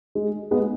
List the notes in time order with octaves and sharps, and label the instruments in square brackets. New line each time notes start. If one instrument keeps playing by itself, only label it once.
[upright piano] G#3
G#3 B3